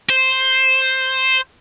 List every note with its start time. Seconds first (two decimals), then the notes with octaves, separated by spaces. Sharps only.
0.09 C5